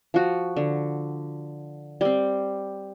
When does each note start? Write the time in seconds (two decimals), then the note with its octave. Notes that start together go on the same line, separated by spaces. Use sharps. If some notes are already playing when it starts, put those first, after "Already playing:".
0.14 F3 F#4
0.57 D3
2.01 G3 C4